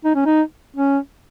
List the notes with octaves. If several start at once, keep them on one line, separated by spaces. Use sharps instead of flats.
D#4
C#4
D#4
C#4